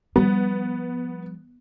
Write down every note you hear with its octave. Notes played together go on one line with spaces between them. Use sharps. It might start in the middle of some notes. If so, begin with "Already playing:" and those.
F3 G3 B3